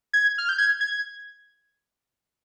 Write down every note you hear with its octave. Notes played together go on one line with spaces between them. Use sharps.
G#6
F6
G6
G#6
G#6